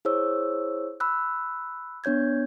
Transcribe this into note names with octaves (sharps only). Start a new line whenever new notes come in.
E4 G#4 C5 C#5 E6
B5 E6 F#6
B3 D4 C#5 G6 G#6